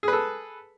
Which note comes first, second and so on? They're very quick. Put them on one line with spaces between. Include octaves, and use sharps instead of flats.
G#4 B4 A4